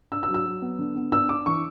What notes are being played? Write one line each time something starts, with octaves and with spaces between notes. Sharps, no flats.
D4 E6
E6
F#3
E6
F#3
B3
D3
B3
D4 E6
D4 D6
E3 C#6